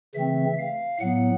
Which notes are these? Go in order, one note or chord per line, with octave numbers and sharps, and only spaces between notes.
C#3 E3 A3 C4 E5
F5
A2 F#3 B3 F#5